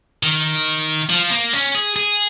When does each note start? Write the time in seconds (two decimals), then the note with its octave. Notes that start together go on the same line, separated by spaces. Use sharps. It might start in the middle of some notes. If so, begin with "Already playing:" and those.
0.23 D#3
1.10 F3
1.31 A#3
1.53 C#4
1.75 G#4
1.96 G#4